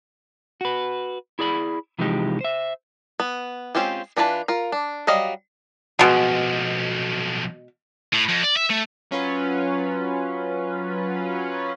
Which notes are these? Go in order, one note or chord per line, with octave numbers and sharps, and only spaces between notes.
F#4 B4
E4 G#4 D5 B5
C3 E3 F3 G#3 D#4 G4
C5 E5
B3
G#3 C4 C#4 F4 G4
E3 D4 F4 B4 A5
F4 A#4
D4
F#3 G3 D#5 F5
B1 B2 F3 G#3
A2
F2
D5
E5
A3
F#3 C#4 F4 B4